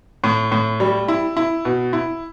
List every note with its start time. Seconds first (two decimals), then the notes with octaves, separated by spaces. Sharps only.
0.24 A2
0.52 A2
0.80 G3
1.08 E4
1.37 E4
1.65 B2
1.93 E4